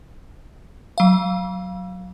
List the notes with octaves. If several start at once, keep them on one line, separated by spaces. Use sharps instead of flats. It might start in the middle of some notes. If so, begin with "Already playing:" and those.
F#3 F5